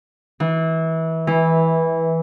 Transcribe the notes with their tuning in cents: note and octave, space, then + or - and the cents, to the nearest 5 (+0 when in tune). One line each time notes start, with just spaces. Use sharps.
E3 -25
E3 -10